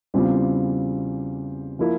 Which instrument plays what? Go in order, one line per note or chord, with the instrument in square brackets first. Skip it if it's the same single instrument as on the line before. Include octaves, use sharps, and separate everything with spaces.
[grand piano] E2 C#3 G3 C4 F4
F3 A#3 E4